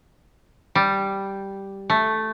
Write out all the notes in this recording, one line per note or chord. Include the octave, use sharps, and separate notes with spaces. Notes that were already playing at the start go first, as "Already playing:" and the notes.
G3
A3